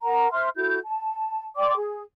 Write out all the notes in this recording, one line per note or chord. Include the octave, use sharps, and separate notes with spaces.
A#4 F#5 A#5
C5 E5 C6 F6
E4 F#4 A4 G6
A5
D5 G5 C6 D6
G#4